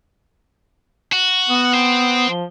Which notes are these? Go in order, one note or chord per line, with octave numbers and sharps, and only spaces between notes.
F#4
B3
C5 G5
F3